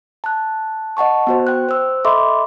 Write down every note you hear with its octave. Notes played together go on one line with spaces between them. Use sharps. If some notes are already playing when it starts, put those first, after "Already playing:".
A5 F#6
D#5 F#5 A5 C#6
B3 F#4 C5
G5 F#6
C5 E6
A4 D#5 E5 B5 C6 D6